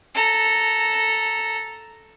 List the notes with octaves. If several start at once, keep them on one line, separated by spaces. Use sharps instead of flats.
A4 A#5